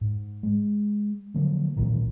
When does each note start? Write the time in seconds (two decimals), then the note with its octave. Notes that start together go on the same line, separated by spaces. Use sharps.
0.01 G#2
0.43 G#3
1.34 D3 F3 F#3 A#3
1.76 B1 A#2 D#3 E3